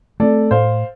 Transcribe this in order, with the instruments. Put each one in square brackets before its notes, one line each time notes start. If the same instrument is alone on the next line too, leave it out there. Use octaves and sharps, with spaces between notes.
[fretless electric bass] A3 C4 [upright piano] A4 D5
[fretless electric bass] A2 [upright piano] C5 F5